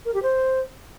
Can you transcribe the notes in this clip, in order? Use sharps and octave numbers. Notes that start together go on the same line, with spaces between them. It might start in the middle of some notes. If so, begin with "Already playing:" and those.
A#4
G4
C5